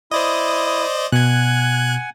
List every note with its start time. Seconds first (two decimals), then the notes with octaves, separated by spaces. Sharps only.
0.11 E4 C5 D5 D#5 D#6
1.12 B2 F#5 G#5 F#6 G#6